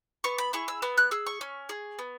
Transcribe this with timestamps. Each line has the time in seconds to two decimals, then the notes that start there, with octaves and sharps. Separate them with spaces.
0.24 B3 C#6
0.38 B5
0.53 E4 G#4 C#6
0.68 E6
0.82 B3 E6
0.97 F#6
1.11 G#4 E6
1.26 C#6
1.41 C#4
1.69 G#4
1.99 B3